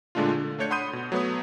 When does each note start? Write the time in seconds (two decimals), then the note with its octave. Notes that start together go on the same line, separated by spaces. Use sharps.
0.15 A#2 D3 G#3 A3 D4 F4
0.33 D3
0.59 A3 D4 C#5 G6 C#7
0.70 F#5 B5 C6 D#6 G6 D#7
0.93 B2
1.12 F#3 A3 B3 B4 C#5 D#6